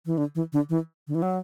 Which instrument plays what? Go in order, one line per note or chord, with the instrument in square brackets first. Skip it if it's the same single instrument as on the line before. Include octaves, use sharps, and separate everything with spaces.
[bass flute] E3
D3
E3
D3
E3
D3
E3
F#3